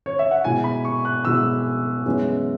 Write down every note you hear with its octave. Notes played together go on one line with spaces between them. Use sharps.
C#5
E5
F#5
B2 G#3 E4 G#5
B5
C#6
F#6
B2 G#3 E4 E6
F#2 E3 G#3 B3 E4